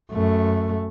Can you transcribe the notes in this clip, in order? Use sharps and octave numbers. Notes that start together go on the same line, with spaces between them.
F#2 A3